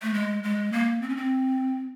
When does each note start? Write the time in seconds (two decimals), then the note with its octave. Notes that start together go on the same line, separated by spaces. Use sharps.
0.02 A3
0.14 G#3
0.44 G#3
0.72 A#3
1.02 C4
1.09 C#4
1.17 C4